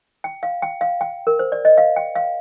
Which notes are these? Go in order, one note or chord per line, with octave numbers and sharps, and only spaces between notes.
G5
F5
G5
F5
G5
A#4
C5
D5
D#5
F5
G5
F5